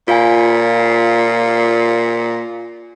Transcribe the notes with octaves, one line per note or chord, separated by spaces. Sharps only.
A#2 F4 F5 G#5